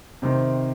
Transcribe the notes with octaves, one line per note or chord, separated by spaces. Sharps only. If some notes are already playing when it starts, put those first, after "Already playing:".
C3 D#3 C4